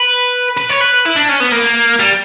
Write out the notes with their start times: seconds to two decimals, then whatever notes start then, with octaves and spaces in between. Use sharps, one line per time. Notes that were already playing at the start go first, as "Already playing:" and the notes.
Already playing: B4
0.57 B4
0.69 C#5
0.80 B4
1.05 E4
1.16 D4
1.29 C#4
1.40 B3
1.52 A#3
2.00 G3